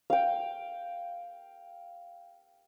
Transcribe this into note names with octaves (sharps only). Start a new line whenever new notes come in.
F5 G5